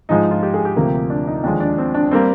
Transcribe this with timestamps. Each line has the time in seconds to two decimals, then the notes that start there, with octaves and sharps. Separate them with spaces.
0.09 G#2 F3 G#3 D#4
0.31 F4
0.43 G4
0.54 G#4
0.65 G4
0.76 D2 C3 F3 A#3
1.10 D4
1.27 D#4
1.43 D#2 D3 F3 G#3 D4
1.60 D4
1.78 C4
1.94 D4
2.11 G3 A#3 C4